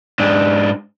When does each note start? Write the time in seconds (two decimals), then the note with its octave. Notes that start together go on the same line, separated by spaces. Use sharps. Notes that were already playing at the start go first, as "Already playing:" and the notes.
0.20 G#2 D4